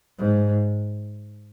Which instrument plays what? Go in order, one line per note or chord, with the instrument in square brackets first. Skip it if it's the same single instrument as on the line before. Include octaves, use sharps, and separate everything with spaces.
[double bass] G#2